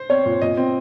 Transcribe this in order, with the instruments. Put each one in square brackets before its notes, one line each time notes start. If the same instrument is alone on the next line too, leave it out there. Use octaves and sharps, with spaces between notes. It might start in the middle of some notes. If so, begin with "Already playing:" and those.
Already playing: [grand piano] C5
[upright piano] C4 [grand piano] C#5
[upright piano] A#2
[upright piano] A#2 [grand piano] D#5
[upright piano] C4